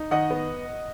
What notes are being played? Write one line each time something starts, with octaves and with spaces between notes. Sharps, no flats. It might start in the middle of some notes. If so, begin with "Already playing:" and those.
Already playing: D#4
D#3 D#5 F#5
B3